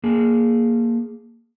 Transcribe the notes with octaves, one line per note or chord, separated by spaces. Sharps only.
A#3 G#4